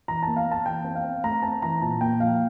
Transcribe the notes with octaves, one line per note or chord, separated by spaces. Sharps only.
E3 A#5
A#3 A5
F5
A#3 A5
E3 G5
C4
F5
C4
A3 A#5
C4 A5
E3 A#5
A#2 A5
A#3 G5
F3 F5